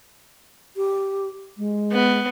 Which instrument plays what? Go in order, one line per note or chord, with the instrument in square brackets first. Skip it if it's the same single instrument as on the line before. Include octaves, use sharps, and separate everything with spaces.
[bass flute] G4
G#3
[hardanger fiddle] B3